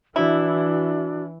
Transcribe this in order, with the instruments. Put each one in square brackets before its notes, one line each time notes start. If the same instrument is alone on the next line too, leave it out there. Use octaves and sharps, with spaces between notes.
[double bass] E3 [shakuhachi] D4 [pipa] E4 [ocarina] F#4